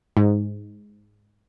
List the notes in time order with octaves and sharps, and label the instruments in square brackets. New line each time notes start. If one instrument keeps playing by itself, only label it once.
[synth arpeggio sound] G#2